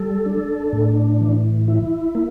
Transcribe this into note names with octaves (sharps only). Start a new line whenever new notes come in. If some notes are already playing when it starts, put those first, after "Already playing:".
Already playing: G3 A4
D4
A2
E3
E4
A#3